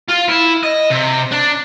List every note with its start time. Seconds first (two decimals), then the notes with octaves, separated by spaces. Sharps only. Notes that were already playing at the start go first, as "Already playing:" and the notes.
0.09 F4
0.29 E4
0.63 D#5
0.90 C3
1.31 D4